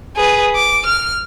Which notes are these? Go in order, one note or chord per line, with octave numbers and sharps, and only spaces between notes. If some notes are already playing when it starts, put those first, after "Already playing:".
G#4 B4
D6
F6